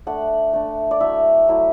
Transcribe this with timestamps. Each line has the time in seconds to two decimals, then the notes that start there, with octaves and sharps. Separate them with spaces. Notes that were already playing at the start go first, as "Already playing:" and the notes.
0.07 A3 D4 F#5
0.53 A3 D4
0.91 D5
1.00 F#3 A3 E4 E5
1.48 F#3 A3 E4